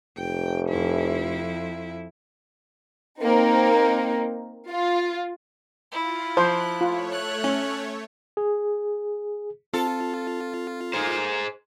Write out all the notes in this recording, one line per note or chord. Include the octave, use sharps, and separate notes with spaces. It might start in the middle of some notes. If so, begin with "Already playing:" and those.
F1 G5
F2 E4
A#3 C4 D#4
F4
E4 F4
F3 C5 F#6
A3 F4 C#5
F#6
C#4
G#4
C4 F4 A4
A#3 D#4 G#4 C5